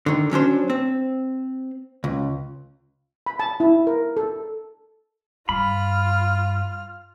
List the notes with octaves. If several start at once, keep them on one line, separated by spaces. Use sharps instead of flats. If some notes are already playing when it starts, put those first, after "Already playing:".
D3 D#3
F#3 C#4 D4 C5
C4
C#2
B5
A5
E4
A#4
A4
G2 F4 B5 F6